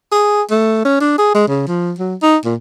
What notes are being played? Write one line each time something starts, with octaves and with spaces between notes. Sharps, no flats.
G#4
A3
C#4
D4
G#4
G#3
C#3
F3
F#3
D#4
A#2